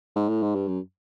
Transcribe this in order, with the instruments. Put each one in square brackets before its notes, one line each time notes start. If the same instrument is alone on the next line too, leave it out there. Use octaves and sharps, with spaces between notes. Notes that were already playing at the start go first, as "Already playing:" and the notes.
[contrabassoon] G#2
A2
G#2
G2
F#2